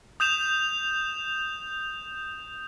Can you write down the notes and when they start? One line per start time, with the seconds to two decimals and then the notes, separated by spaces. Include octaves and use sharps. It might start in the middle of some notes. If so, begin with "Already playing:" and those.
0.20 D#6 G6 E7 F7